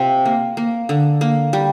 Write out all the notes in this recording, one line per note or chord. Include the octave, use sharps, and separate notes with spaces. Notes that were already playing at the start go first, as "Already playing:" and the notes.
Already playing: C3 C4 F4
A#3
A#3
D3
A#3
G3